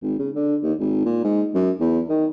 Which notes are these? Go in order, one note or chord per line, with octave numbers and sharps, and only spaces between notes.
G#1
C#3
D3
D#2
G#1
A#2
G#2
F#2
E2
D#3